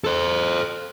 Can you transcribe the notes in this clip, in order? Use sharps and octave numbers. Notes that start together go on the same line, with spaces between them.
A4 C5